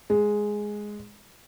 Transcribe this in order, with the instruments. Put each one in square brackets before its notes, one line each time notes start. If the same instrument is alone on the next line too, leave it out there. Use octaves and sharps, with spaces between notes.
[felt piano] G#3